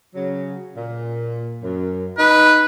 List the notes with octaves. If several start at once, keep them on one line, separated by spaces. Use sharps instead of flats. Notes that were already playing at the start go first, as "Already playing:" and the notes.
C#3 F#3
A#2
F#2
D#4 B4